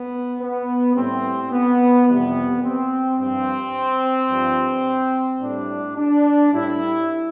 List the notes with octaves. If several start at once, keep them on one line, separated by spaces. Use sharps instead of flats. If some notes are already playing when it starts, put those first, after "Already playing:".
Already playing: B3
B3
A2 G3 C4
B3
F2 C3 E3 G3 B3
C4
G2 F3 C4
G2 F3
A2 G3 D4
D4
A2 G3 E4